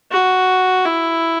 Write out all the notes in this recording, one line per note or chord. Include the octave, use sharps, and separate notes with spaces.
F#4
E4